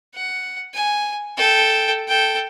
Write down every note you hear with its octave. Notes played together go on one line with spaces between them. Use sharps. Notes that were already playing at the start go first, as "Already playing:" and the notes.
F#5
G#5
A4 G5
A4 G5